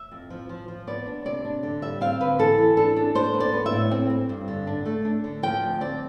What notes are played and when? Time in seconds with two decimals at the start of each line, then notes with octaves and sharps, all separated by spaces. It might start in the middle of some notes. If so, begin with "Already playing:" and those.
Already playing: E5
0.11 F2
0.30 F3
0.49 F3
0.68 F3
0.87 B3 D5
1.06 D4
1.25 C3 D5
1.45 D4
1.63 D3
1.82 G3 E5
2.01 C4 F5
2.20 D3 B4
2.39 E3 A4
2.58 E3
2.77 D4 A4
2.96 D4
3.15 D4 C5
3.34 B3
3.40 D5
3.53 B3
3.66 E5
3.72 A2
3.91 C4
4.10 C4
4.29 G2
4.48 D3
4.67 D4
4.86 A3
5.05 D4
5.24 D3
5.43 F3 G5
5.62 D2
5.81 C4 D5